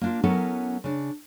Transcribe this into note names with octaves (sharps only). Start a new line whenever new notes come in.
A#3 D4 F4
F#3 B3 C#4 E4 A4 A#4
C#3 D4